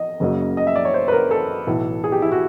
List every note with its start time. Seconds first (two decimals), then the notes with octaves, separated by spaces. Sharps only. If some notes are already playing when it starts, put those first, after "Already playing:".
Already playing: D#5
0.20 F#1 F#2 C#3 F#3 A#3
0.57 D#5
0.67 E5
0.75 D5
0.85 C#5
0.94 C5
1.08 B4
1.12 A#4
1.31 A4
1.67 B1 A2 E3
2.04 G#4
2.12 G4
2.22 E4
2.32 F#4